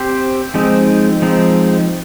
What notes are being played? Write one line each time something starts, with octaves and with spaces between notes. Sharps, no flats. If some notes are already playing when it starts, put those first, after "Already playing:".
Already playing: C4 G4 C5
F3 G#3 C4 D#4
F3 G#3 C4 D#4